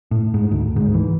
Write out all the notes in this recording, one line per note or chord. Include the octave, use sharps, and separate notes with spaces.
A2
G#2
D2
G#2
E3